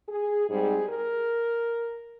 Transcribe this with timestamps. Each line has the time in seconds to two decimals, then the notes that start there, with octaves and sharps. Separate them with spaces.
0.09 G#4
0.48 G#2 G3 C4 G#4
0.89 A#4